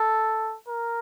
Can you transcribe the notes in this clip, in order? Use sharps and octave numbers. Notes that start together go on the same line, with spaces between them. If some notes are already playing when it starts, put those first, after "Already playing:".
Already playing: A4
A#4